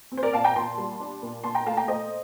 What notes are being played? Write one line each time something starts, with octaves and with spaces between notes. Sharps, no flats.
C4
C5
A#4 D5
A#2 F5 A5
G5 A#5
A#2 A5 C6
G3
D4
A#2
A#2 A5 C6
G5 A#5
A3 F5 A5
G5 A#5
A3 C5 D#5